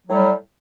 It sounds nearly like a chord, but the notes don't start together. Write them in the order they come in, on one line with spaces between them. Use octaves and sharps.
F#3 A2 G3